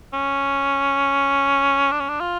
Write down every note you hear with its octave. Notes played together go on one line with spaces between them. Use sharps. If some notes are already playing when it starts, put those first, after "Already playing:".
C#4
D4
C#4
D4
F4